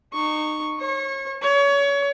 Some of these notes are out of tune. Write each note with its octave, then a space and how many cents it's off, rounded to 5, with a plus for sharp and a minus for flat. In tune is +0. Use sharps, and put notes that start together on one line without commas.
D#4 -30 C#6 +0
C#5 -35 C#6 -25
C#5 +30 C#6 +25